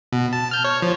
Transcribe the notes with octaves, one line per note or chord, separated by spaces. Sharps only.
B2
A5
F6 G6
C#5
F3